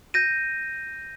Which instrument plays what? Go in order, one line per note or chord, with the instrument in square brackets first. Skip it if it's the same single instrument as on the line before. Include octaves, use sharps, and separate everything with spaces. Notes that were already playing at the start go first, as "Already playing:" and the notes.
[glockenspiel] G6 A#6 D#7